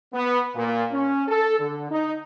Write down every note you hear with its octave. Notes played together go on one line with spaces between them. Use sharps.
B3
A#2
C#4
A4
D3
D#4